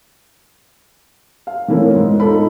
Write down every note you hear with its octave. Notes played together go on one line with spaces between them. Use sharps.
F5
E3 A3 C4 C#4 E4 A#4
E1 G#2 G#3
D#4 F4 A4 B5